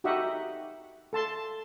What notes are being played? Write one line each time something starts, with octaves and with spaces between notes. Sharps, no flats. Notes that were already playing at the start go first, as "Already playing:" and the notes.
D#4 F#4 G4 D#5 E5 F#5
A4 A5 C6